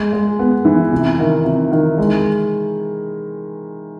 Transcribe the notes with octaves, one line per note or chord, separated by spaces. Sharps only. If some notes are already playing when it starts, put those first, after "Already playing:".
Already playing: G#3
G#3
B3
E3
C3
D#3
C3
D#3
G#3